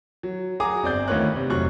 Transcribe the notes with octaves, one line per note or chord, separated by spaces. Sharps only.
F#3
F#4 G#4 A#5 D6 D#6
G1 C4 D5 G6
D2 D#3 F4 B4 C#5 F#6
C3
F1 F#3 C#6 F#6